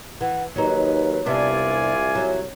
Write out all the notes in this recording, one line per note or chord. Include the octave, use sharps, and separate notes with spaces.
E3 F#5
D#2 F#3 D#4 B4
C2 C3 B3 D4 F4 D5 E5 G#5
F#3